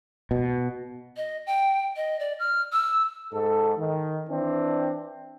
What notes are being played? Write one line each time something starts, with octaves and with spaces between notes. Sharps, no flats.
B2
D#5
G5
D#5
D5
F6
E6
G#2 A4
D#3
E3 C4 D4